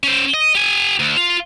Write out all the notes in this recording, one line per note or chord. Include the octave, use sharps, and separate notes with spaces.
C#4 C5
D#5
G4 G#5
D2
F4